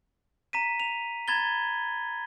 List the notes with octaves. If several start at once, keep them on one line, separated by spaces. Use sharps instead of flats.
A#5 B6 D#7
F7
A#5 B5 G#6 A6 G7